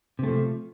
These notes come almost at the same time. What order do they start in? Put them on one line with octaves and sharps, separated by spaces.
C3 A3 F3